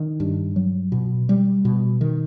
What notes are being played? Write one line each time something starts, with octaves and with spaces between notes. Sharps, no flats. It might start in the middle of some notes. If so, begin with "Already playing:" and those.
Already playing: D#3
G2
F#3
B2
G3
B2
D#3